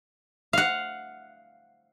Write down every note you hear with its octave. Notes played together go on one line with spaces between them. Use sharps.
F5 F#5